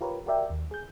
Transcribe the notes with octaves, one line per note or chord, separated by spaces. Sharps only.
F4 G4 A#4 B4 C#5
F#4 G4 A#4 D5 E5 G5
D#2
G#4 G6